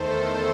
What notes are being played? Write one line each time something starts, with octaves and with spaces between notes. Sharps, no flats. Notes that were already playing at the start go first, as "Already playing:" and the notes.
Already playing: E2 D#3 A3 A4 C5